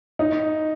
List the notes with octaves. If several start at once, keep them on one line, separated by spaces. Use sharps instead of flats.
D#4